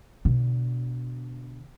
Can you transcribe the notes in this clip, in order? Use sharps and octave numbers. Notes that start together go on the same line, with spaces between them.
B2 D3